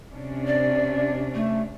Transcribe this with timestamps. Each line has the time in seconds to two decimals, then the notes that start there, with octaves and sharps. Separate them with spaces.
0.12 C3 C#4 D4
0.47 D5
1.34 A3